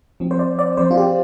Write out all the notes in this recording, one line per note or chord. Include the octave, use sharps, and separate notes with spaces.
F3 C4
C5
D5
D5
F3 C4 C5
F4
G4